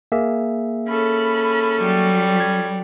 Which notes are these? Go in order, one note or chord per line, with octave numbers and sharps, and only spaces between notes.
A#3 G#4 E5
C#4 A4 B5
F#3 G3
G#6